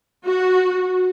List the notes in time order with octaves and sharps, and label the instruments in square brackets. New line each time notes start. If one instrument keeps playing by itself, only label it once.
[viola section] F#4